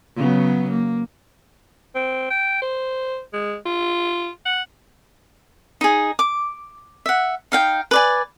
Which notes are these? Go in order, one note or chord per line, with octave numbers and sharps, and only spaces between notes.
C#3 F#3 B3
A#3
C4
G5
C5
G#3
F4
F#5
D#4 G#4
D6
E5 F#5
D#4 F5 G5
B4 D5 G#5